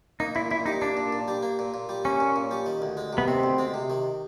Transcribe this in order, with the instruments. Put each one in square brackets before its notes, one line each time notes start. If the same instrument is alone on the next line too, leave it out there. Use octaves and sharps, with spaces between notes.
[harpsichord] A#3 [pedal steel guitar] D#4
[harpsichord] A#2 [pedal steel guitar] E4
[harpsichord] A#2 [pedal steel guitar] E4
[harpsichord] G3 [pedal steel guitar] D#4
[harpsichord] A#3 [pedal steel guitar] D4
[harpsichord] A#2
A#2
G3
A#3
A#2
A#2
G3
[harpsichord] A#3 [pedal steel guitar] C#4
[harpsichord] A#2
A#2
G3
D#3
D2
G#3
C3
[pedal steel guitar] B3
[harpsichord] D#3 [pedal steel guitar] C4
[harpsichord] D2
G#3
C3
D#3